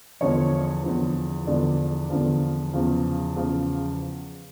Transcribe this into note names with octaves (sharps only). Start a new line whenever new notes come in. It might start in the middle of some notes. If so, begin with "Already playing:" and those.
E2 D3 F3 C#5
E2 D3 F3
E2 D3 F3 D5
E2 D3 F3
E2 C#3 F3
E2 C#3 F3